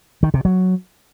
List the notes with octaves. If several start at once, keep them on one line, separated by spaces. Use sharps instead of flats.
D#3
C3
F#3